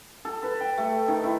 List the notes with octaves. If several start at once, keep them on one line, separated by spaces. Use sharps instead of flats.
A4
B4
G5
A3
D#3
E4